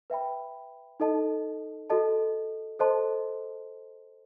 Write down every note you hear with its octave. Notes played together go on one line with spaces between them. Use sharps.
B4 E5 G5 B5
D#4 A4 D#5 A5
F#4 A4 D#5 A5
A4 C5 D#5 A5 C6